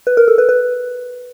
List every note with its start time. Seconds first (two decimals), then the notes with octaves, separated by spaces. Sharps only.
0.07 B4
0.17 A#4
0.28 A4
0.38 B4
0.49 B4